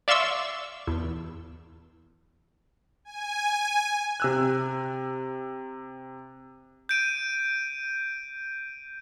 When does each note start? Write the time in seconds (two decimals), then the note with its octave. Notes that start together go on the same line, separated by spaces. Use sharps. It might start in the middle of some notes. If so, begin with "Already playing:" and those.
0.08 D5 E5 F5 C6 C#6 E6
0.87 E2
3.05 G#5
4.20 C3 E6 F#6
6.89 G6 D7 D#7